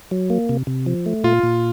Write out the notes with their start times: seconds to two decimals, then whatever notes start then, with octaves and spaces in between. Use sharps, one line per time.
0.11 F#3
0.30 A#3
0.49 C3
0.67 C3
0.86 F3
1.06 A3
1.24 A#2 F4
1.43 A#2